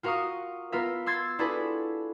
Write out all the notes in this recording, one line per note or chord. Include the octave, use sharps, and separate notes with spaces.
F4 F#4 A#4 F5 C#6 D#6
B3 F4 A#4 E5
C6 E6 G#6 A6 C7
D4 E4 F#4 G#4 A4 B4